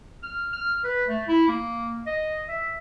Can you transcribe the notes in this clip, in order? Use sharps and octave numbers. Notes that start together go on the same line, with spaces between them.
F6
F6
B4
A3
E4
A#3
D#5
E5